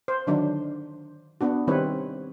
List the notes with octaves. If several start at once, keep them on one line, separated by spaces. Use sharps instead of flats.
C5
D3 D#3 F#3 D4
B3 D4 F#4
D#3 G3 C4 E4 B4 C#5